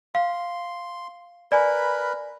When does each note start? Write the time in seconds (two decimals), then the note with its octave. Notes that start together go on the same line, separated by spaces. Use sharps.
0.15 F5 C6
1.52 A#4 B4 D5 G#5 B5